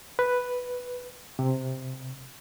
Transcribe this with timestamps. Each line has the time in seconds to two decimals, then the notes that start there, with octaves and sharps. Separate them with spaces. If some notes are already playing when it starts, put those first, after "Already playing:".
0.19 B4
1.39 C3